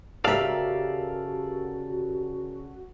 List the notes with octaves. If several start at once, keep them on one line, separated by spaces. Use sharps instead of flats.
C#3 F#4 G4 A4 A#4 D5 E5 F5